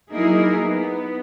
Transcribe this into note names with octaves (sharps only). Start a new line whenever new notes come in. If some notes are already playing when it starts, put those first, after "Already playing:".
F#3 A#3 D#4 E4 G#4 A#4
B3